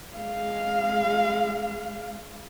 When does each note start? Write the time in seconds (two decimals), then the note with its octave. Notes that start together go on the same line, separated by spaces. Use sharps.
0.16 G#3 F5